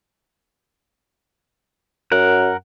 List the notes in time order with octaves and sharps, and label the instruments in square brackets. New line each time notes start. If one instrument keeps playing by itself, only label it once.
[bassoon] F#2 [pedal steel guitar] A#4 F#5